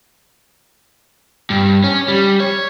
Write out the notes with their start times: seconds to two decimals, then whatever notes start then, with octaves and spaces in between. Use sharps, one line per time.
1.50 G2
1.84 C#4
2.08 G3
2.40 C#5